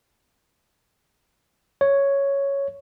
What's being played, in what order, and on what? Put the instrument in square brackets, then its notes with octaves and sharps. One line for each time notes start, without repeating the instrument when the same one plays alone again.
[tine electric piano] C#5